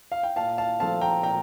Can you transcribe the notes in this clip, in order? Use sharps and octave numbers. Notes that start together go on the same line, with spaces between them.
F5
G5
A#2 F5 A5
F5 A5
F3 A3 C4 F5 A5
G5 A#5
A#2 G5 A#5